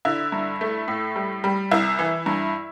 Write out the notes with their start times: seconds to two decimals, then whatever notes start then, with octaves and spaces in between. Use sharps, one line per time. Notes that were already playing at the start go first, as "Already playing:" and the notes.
0.05 D3 E4
0.32 G2
0.61 A3
0.88 A2
1.16 G3
1.44 G3
1.71 C2 E4
1.99 E3
2.26 G2